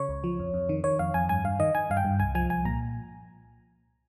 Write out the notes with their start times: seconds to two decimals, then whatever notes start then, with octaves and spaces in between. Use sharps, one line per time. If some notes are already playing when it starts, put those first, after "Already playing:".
Already playing: C#3 C#5
0.09 C#2
0.24 F3
0.39 F2
0.54 F2
0.69 D#3
0.84 D#3 C#5
0.99 F2 F5
1.14 F2 G#5
1.29 G2 G#5
1.44 G2 F5
1.59 D#3 D#5
1.75 D#3 G#5
1.90 G2 F5
1.97 G5
2.05 G2
2.20 C2 G#5
2.35 F3 G#5
2.50 C2 G#5
2.65 A#2 A#5